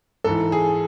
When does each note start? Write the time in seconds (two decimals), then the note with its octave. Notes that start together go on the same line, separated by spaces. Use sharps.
0.24 G#2 E3 A4
0.52 G#4